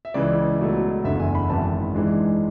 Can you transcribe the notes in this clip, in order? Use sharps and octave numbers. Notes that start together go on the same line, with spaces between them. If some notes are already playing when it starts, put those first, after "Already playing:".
E5
C#2 C#3 E3 D5
C#2 B2 F#3 A3
F#1 E2 D3 E5
G#5
B5
G#1 F#2 C#3 E3 A5
G#2 E3 G#3 D4